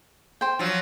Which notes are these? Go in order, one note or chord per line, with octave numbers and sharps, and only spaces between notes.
C5 G5
F3 F#3